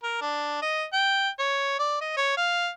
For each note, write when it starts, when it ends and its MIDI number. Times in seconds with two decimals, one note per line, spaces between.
0.03 0.18 70
0.21 0.58 62
0.62 0.85 75
0.93 1.29 79
1.39 1.78 73
1.79 1.99 74
2.01 2.13 75
2.17 2.32 73
2.37 2.69 77